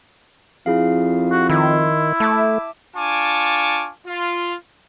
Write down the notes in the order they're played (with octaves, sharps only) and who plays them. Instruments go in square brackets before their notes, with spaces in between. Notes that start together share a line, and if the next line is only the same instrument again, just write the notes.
[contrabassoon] F2 [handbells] E4 G#4 F5
[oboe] F#4
[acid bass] D#3 [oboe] E4
[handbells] C6
[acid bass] A3 [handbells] E5 A5 D6
[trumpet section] D4 F4 G#5 A5 C#6 D6
F4